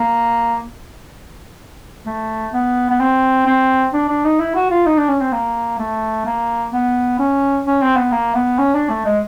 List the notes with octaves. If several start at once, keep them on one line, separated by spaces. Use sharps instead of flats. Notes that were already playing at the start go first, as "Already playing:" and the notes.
Already playing: A#3
A3
B3
B3
C4
C4
D4
D4
D#4
E4
F#4
F4
D#4
D4
C#4
C4
A#3
A3
A#3
B3
C#4
C#4
C4
B3
A#3
B3
C#4
D4
A3
G#3